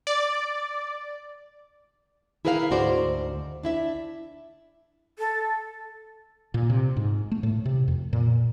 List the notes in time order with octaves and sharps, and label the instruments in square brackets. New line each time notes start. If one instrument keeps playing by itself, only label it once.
[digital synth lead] D5
[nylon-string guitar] E4 G#4 A#4 B4 D#5 F5
D2 G#2 F#4 C5 D5
D4 E4 E5
[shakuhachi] A4
[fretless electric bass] A#2
C3
G#2
A3
A2
C3
F2
A#2